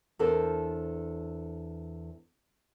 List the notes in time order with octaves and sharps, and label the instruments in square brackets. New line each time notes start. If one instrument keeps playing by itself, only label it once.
[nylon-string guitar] E2 D4 A4 A#4 C5